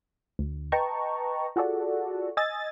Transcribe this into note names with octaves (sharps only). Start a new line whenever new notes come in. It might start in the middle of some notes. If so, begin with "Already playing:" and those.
D2
B4 D#5 G5 A5 A#5 C#6
F4 F#4 G#4 A4 D5 F#5
D#5 G#5 E6 A6